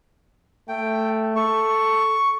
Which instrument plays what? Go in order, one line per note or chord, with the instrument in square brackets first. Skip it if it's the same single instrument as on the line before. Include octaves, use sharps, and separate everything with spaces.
[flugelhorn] A3 [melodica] G5
[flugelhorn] A4 [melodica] C#6